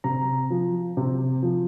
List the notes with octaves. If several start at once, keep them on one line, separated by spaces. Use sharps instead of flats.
C3 A#5
F3
C3
F3